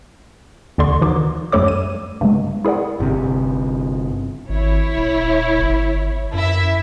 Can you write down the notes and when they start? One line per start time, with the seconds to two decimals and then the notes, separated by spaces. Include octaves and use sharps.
0.78 D#2 D3 D5 C6 C#6
1.01 D#3 E3 D#4 F#4 D6
1.52 F#2 G3 A3 A4 C#5 D6
1.68 D#7
2.21 G2 C#3 G#3
2.65 E4 G#4 A#4 D5 F#5
3.00 G1 C3
4.49 G#1 E4 C#5
4.97 D#1
5.59 G1
6.34 F#2 E4 E5